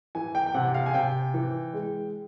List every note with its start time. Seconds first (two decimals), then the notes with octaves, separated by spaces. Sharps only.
0.15 E3 G#5
0.35 G5
0.46 G5
0.54 C3 F#5
0.74 F5
0.86 G#5
0.94 C3 G5
1.34 E3
1.73 G#3